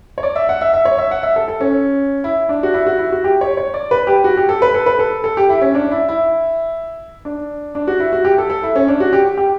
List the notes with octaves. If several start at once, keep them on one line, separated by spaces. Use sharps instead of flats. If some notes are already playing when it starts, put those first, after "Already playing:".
C#5
D5
E5
F#5
E5
E5
C#5
E5
F#5
E5
A4
A4
C#4
E4
D4
F#4
E4
F#4
E4
F#4
G4
C#5
C#5
D5
B4
G4
F#4
G4
A4
B4
A4
B4
A4
A4
G4
E4
C#4
D4
E4
E4
D4
D4
F#4
E4
F#4
G4
A4
A4
E4
C#4
D4
F#4
G4
G4